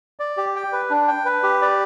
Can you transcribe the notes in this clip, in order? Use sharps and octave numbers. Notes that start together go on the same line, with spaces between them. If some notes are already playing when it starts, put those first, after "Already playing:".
D5
G4
G5
B4
D4
G5
B4
G4
D5